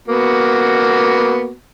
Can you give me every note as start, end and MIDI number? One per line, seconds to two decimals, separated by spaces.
0.08 1.52 58
0.08 1.52 59
0.08 1.52 66